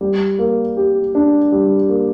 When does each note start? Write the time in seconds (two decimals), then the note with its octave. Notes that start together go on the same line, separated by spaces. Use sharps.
0.01 G3
0.39 A#3
0.77 G4
1.15 D4
1.52 G3
1.89 A#3